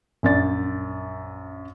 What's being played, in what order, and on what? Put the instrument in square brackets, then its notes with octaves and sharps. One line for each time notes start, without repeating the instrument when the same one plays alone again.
[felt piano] A#1 F#2 D5 A6